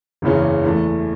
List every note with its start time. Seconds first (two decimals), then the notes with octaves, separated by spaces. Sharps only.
0.22 F#1 E2 C#3 E3 C#4
0.64 E2 E3 A3